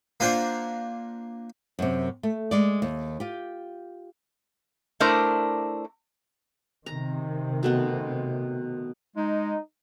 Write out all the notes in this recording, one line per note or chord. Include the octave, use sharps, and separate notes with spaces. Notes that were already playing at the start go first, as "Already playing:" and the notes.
A#3 D4 F4 C5 F#5
F#2 C3
A3
G#3 D5
D#2
F4 G4
A3 D4 E4 A#4 C5 D5
C3 D#3 A#5
B2 A3 B3
G#3 D#4